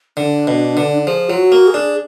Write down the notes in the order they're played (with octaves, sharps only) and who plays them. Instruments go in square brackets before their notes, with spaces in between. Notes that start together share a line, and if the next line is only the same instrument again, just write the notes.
[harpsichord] D3 [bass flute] D4
[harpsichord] B2
D3
[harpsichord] F3 [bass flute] G#4
[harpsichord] F#3 [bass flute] F4
[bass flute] F#4
[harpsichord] A#3
[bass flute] G#4
[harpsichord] D4